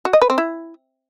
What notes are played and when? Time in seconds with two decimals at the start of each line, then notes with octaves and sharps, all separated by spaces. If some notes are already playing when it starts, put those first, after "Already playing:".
0.05 F#4
0.13 D#5
0.22 B4
0.30 C4
0.38 E4